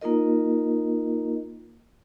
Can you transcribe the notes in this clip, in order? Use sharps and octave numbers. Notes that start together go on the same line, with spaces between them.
A#3 D#4 F4 A#4 D#5